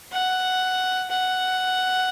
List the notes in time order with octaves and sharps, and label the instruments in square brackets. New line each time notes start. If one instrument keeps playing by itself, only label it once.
[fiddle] F#5
F#5